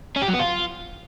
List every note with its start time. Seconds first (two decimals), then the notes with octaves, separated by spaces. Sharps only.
0.16 C#4
0.22 G4
0.28 F#3
0.33 B3
0.39 F4